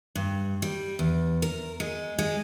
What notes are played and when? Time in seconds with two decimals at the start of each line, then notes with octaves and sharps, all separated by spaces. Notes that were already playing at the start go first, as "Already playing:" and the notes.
0.16 G2
0.62 G3
0.99 E2
1.42 A#4
1.80 G#3
2.18 G#3